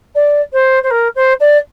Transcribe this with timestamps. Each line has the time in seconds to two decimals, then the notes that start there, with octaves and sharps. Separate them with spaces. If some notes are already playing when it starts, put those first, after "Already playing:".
0.15 D5
0.52 C5
0.83 C5
0.90 A#4
1.15 C5
1.40 D5